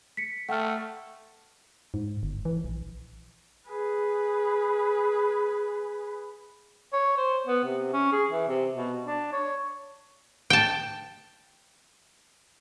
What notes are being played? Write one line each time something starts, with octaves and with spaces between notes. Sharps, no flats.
B6 C#7
A3 F#5 G5 F6
G#2
G1
E3
A#1
G#4 B4
C#5
C5
B3
C3
C#4
G#4
E3
C3
B2
D4
C#5
G5 A5